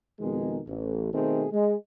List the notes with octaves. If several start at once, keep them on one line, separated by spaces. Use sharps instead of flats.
F2 B2 D#3 G#3
A1
B2 D#3 A3 C4 G#4
G#3